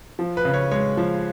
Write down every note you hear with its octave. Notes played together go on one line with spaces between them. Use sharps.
F3
B4
C#3
C#5
G#3 C#5
F3